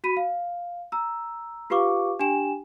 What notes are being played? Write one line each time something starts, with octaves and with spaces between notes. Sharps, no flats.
F#4 B5 B6 D#7
F5
A#5 E6
F4 G4 B4 F5 C#6 D6
D4 G4 G5 G#5 E7